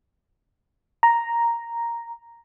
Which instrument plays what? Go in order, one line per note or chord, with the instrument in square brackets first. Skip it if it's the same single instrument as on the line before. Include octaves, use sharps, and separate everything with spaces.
[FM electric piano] A#5